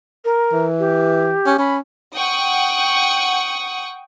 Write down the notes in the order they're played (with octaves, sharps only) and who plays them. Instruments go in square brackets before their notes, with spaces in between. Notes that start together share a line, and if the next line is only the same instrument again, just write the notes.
[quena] A#4
[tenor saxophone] E3
[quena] G4
[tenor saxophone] C#4
[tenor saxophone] C#4 [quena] B5
[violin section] F#5 G5 C#6 D#6